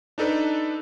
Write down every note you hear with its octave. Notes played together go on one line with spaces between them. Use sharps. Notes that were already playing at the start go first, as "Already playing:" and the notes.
D4 D#4 A4 B4 D5